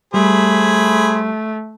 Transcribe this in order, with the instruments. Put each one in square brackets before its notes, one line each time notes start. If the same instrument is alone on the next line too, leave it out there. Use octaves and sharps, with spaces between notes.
[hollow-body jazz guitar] G3 [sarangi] A3 [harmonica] G#4 C5 B5